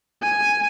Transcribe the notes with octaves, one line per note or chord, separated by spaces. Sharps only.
G#5